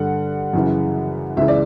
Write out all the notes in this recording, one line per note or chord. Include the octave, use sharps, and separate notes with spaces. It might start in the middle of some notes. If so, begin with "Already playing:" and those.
Already playing: G2 D3 F#5
F#2 C#3 E3
C#2 C#3 E3 E5
D5